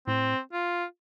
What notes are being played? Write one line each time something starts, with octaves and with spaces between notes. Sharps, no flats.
A2 C4
F4